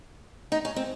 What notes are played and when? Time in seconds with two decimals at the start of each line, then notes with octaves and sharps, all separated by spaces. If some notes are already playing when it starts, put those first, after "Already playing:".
0.52 D#4
0.65 C#4
0.76 C4